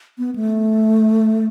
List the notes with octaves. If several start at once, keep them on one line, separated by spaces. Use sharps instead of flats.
B3
A3